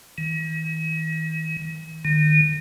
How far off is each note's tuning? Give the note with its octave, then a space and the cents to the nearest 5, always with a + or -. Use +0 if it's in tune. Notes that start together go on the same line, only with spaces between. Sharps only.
D#3 +45
D#3 -30